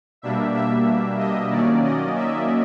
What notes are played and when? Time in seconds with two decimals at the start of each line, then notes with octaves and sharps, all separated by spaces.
0.22 B2 G3 A#3 D4 E5
0.54 E5
1.19 D#5
1.50 D#3 F#3 A#3 C#4 D5
1.83 D#5
2.16 E5